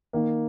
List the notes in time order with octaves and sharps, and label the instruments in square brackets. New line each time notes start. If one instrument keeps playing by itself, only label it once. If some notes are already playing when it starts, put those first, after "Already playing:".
[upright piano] D#3 [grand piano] A#3